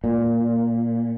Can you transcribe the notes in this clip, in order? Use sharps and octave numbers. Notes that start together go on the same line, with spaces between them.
A#2